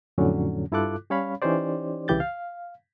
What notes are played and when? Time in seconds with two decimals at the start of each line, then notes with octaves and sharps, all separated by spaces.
0.18 F2 A2 D3 F#3 C#4
0.72 G2 E4 F4 A4 D6 F#6
1.10 G3 C#4 C#5 F5 B5
1.42 E3 C#4 D#4 G4 C5 D5
2.08 C2 C#3 E3 G4 G6 A6
2.20 F5